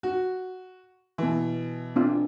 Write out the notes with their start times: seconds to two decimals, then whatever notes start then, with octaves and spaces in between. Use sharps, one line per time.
0.03 F#4
1.18 B2 E3
1.96 C4 D4 F4